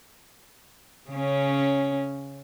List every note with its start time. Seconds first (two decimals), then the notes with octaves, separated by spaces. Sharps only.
1.10 C#3 C#4